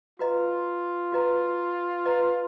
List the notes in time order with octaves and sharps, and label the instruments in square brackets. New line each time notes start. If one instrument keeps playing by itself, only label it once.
[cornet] F4 [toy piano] F#4 B4 D#5 A#5
[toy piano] F#4 B4 D#5 A#5
B4 D#5 A#5